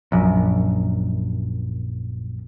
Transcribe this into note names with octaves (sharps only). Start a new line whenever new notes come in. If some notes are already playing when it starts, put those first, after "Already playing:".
A#1 F#2